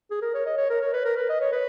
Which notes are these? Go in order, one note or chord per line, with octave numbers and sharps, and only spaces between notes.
G#4
A#4
C#5
D#5
C#5
A#4
C#5
B4
A#4
B4
D#5
C#5
B4